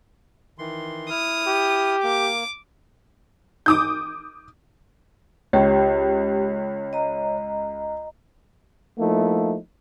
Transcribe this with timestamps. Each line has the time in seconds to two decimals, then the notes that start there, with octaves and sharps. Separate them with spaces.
0.58 D#3 E3 C6
1.10 E4 D#6 F6
1.47 G4
2.03 A#3 D6
3.66 D6 D#6 G6
5.53 C#2 G4 C#5
6.93 D#5 A#5
8.99 F3 A3 A#3 D#4 E4